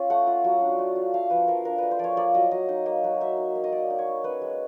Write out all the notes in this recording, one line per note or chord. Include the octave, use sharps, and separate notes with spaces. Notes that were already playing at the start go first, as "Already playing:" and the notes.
Already playing: C#4 F4
A3 F#5
F4
F#3
D4
A3
F4
A3 F5
F3 B4
F3 A#4
D4 A#4
A3 B4
C5
F3 C#5 D5
A#3 D5
F#3 D#5
F#3 D#5
D#4
A#3
F#3
D#4 E5
D#4
A#3
D#5
A#3 D5
D#4
C#5
D#4
C#4 B4
G#3